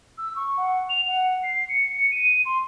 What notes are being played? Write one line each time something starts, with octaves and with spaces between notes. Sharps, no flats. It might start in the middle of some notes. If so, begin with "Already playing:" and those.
E6
C#6
F#5
F7
F#5
C7
C#7
C#7
D#7
C6